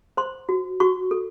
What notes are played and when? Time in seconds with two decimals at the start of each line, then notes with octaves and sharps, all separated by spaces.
0.17 C5 C6
0.49 F#4
0.80 F#4 C#6
1.11 A4